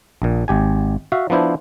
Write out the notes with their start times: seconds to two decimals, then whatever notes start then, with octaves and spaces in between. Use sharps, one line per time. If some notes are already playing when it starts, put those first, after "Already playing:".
0.22 A#1 A#2
0.48 G#1 G4 G#5
1.12 F#4 E5 F5
1.30 F3 B3 D4 E4 C5